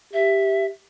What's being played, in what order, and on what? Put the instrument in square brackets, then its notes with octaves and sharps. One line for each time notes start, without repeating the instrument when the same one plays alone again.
[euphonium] G4 [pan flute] E5